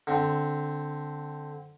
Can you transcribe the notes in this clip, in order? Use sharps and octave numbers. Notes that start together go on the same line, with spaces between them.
D3 C4